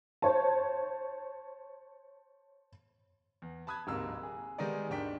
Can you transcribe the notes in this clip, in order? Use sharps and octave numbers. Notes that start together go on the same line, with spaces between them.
C5 C#5 A5
E2
A5 B5 D#6 F#6 G#6
D1 G#2 C3 A#3 E6
G#4
D#3 G3 G#3 B3 D#4 D5
D#1 G#2 D#3 D4 G5 B6